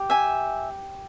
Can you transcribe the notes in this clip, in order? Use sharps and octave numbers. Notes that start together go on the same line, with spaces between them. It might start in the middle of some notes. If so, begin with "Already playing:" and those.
Already playing: G4
E5 G#5